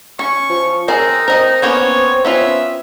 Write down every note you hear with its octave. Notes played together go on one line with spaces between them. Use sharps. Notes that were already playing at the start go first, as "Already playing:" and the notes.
C#4 C#6
F3
C4 D#4 G#4 A#4 G#5
C4 A#4 D#5
A#3 B3 C#4 C#5
B3 C#4 F4 E5